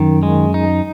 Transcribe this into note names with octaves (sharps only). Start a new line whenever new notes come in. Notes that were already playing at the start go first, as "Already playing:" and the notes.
Already playing: F#2 D#3
G#3
D#4